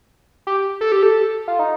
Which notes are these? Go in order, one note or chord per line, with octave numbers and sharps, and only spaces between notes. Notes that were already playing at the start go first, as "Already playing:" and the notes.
G4
A4
G4
A4
F4
D#4